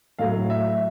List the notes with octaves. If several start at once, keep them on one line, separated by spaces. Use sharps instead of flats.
A2 F#3 A3 F5
E5